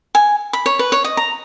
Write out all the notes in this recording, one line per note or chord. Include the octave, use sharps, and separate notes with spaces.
G#5
B5
C#5
B4
C#5
D#5
A#5